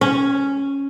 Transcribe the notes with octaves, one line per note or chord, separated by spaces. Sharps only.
C#4